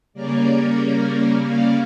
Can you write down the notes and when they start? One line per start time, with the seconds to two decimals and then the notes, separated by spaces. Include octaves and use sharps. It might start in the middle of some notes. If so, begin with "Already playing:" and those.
0.14 C#3 G3 A#3 C#4 A#4 D5
1.42 D5 F5